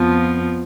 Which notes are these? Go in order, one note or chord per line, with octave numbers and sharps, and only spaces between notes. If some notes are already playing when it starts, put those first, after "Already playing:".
Already playing: F2 F3 B3